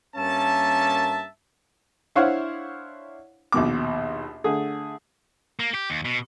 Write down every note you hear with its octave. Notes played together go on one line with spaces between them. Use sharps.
G2 A#3 C#4 A#4 E5 A5
D4 E4 C5 C#5 F5 F#5
A#1 D#2 B2 D6
D3 A3 G#4
A#3
G4
D#2
B2